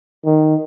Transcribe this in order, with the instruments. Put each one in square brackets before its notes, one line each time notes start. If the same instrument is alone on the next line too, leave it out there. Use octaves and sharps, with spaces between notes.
[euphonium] D#3